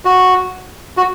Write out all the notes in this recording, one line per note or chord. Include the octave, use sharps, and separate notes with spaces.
F#4
F#4